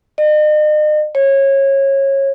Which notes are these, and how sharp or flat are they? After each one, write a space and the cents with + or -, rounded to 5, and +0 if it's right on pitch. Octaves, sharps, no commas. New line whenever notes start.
D#5 -40
C#5 -20